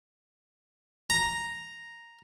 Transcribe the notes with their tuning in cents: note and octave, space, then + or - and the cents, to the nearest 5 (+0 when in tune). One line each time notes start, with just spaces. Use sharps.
A#5 +0